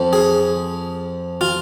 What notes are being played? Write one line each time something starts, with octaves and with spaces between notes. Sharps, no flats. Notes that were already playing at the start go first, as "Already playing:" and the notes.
Already playing: F2 F3
G#4
F4